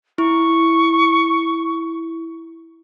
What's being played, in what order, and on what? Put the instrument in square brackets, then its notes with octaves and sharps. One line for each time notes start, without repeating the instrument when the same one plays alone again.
[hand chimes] E4 [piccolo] C#6